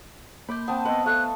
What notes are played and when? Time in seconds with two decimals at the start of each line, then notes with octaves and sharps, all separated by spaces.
0.49 A#3 B5 D6 G6
0.68 C4 F#5 A5 D#6
0.85 B3 B4 C5 D#5
1.06 A3 A4 D#5 F5 F#6